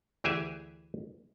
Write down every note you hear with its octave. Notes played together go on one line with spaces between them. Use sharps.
D2 E3 G4 G#4 E5 G#5